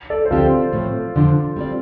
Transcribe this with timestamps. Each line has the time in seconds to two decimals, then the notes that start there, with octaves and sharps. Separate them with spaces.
0.10 A4 D5
0.25 C5
0.31 D2 D3 F3 C4 F4 G4 A4
0.73 A2 F3 A3 C4
1.15 F2 D3 F3 D4
1.56 G3 C4 F4 D5